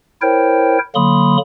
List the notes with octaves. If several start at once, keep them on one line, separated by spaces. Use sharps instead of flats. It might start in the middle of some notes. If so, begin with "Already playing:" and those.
E4 A#4 C5 C#5 G5
D3 F#3 A#3 B5 C6 D#6